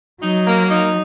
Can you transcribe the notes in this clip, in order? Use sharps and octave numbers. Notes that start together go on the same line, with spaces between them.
F#3 D#4
A#3
D#4